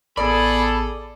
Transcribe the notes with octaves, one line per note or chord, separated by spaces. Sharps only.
A1 B3 G#4 A4 D5 B5